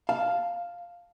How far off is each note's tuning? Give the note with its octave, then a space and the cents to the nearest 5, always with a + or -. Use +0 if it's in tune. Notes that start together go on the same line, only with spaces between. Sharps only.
F5 +0 A5 +0